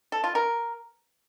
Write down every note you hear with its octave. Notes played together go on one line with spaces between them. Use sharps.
A4
F4
A#4